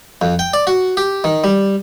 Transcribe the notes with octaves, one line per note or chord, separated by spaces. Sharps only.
F2
G5
D5
F#4
G4
D#3
G3